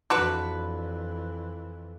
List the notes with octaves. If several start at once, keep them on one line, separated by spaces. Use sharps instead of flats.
F2 E3 D4 F#4 B4